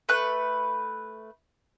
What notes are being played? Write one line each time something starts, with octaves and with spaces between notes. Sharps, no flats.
A3 B4 F#6